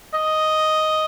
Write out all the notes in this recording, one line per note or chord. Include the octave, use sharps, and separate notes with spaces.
D#5